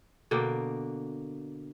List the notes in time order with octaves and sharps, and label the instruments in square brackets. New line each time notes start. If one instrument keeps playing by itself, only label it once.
[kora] B2 D3 A#3 G5